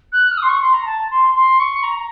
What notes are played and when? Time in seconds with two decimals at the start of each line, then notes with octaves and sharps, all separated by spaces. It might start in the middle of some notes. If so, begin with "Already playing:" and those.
0.12 F#6
0.31 F6
0.37 D#6
0.42 C6
0.49 C#6
0.62 C6
0.74 A#5
0.85 A5
1.11 C6
1.35 C6
1.60 C#6
1.83 A#5
1.95 A#5